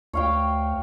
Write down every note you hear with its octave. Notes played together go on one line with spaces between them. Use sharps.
D2 C#5 F5 G5